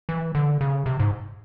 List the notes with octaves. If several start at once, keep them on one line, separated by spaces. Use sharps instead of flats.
E3
D3
C#3
C3
G#2